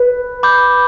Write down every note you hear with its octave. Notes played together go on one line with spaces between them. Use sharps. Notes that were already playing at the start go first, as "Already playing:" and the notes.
Already playing: B4
B5 D6 G6